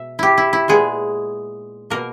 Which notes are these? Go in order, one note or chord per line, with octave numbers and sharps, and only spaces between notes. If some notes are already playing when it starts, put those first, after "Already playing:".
Already playing: B2 E5
E4 G4
E4
E4
A#2 G#3 B3 G#4
B2 A#3 A#4